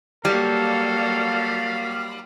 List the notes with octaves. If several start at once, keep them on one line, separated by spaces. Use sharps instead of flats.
F#3 G3 A#3 A4 F5